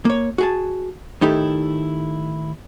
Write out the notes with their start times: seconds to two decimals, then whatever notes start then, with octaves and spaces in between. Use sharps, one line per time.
0.05 A#3 C#5
0.38 F#4 G#4 A5
1.21 A2 D#3 D#4 E4 G4 A4